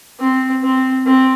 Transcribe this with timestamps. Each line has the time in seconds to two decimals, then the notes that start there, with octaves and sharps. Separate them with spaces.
0.20 C4
0.63 C4
1.06 C4